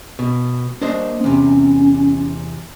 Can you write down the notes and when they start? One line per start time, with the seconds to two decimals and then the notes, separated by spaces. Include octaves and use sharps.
0.19 B2
0.81 A#3 D4 C5 D#5
1.24 E2 C3 C#4